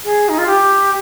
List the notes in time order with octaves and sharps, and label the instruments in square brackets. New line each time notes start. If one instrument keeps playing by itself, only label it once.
[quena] G#4
D#4
F4
G4